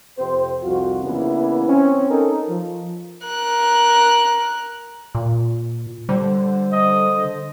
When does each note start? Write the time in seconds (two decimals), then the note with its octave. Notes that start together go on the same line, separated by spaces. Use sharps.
0.18 F2 C3 C4 C5
0.64 C2 F2 F4 F#4
1.04 C#3 E3 A#3 B3 D4 E4
1.68 C4 C#4
2.11 C#4 D#4 A4 A#4
2.49 F3
3.26 A#4 F#6
5.15 A#2
6.09 D3 G3 C5
6.73 D#5